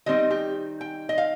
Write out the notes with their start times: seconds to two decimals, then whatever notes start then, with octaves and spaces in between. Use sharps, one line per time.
0.06 D#3 G3 C4 D#4 D#5
0.30 G4
0.81 G5
1.09 D#5
1.18 F5